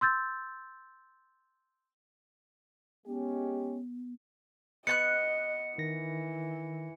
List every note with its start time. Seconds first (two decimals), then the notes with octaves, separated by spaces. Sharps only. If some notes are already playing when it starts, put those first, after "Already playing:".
0.01 C6 E6 G6 A6
3.07 G#3 B3 C#4 G4
4.87 B3 D#5 A5 F#6 C#7
5.78 D#3 E3 A#6